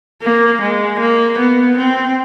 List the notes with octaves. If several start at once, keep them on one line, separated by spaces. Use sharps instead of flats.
A#3
G#3
A#3
B3
C4